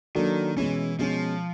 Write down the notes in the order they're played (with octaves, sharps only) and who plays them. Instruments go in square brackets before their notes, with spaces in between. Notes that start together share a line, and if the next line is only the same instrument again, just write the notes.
[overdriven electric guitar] D#3 [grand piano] F#3 A#3 D4 F#4 A4
[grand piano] B2 G#3 C#4 [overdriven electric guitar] E3
[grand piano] B2 G#3 C#4 [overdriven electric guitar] F3